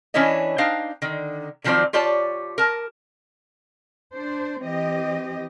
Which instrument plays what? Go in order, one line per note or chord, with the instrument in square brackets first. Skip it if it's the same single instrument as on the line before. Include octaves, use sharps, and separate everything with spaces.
[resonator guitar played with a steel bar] E3 C#4 D4 E4 C#5 D#5
D4 D#4 C5 F5 G5
D3 D#3
D3 D#3 F3 F#3 C4 D5
F4 G4 C#5 D5 A5
A#4 A5
[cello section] D4 C5
E3 C4 G4 D#5